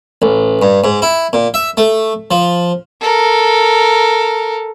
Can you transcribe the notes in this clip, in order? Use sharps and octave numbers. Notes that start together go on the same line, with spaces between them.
A1
G2
G#2
E4
A#2
E5
A3
F3
A4 A#4